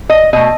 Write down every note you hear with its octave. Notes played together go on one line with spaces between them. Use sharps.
D#5
B2 A3 D#5